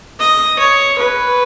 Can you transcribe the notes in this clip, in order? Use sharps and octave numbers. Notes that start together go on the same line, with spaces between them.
D#5
C#5
B4